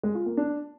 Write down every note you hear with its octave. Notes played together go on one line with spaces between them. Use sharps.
G#3
F4
A#3
D4